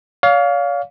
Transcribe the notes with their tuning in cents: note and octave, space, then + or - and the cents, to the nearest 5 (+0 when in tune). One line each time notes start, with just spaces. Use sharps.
C#5 +45 F5 +10